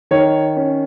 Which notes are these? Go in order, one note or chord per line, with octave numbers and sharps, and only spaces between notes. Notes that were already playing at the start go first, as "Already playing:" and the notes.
D#3 C#5
C#4